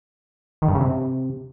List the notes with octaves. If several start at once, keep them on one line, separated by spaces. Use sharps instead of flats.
D#3
G2
C#3
C3